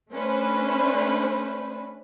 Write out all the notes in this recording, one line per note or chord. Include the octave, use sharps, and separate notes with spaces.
A3 C#4 D4 B4 C5